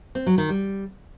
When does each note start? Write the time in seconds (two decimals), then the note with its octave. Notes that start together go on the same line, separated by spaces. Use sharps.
0.15 C4
0.26 F#3
0.38 D#3
0.49 G3